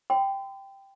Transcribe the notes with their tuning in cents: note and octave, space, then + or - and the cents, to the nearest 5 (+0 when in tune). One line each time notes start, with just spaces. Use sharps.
G5 +0 C6 -45